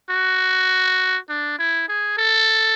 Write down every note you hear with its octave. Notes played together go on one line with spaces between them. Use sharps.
F#4
D4
E4
G#4
A4